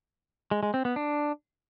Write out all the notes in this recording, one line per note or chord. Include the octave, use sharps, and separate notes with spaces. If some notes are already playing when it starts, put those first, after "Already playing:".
G#3
G#3
C4
B3
D4